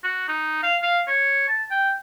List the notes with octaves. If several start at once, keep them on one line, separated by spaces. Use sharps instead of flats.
F#4
D#4
F5
F5
C#5
A5
G5